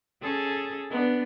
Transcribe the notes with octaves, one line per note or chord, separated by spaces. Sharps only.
C#4 G#4 A4
B3 D4